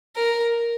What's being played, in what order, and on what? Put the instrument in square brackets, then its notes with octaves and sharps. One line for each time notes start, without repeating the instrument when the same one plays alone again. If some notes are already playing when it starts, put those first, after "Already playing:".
[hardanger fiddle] A#4